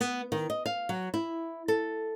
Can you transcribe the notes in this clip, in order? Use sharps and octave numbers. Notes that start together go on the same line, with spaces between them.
B3
D#3
D#5
F5
F#3
E4
A4